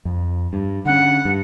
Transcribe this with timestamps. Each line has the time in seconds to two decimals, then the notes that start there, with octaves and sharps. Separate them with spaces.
0.05 F2
0.53 G2
0.85 D3 C#4 F#5
1.25 G2